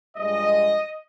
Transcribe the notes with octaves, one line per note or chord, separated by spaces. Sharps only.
G2 F3 G#3 D#5